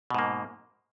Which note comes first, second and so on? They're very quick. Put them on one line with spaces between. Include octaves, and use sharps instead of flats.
B2 G#2 A#3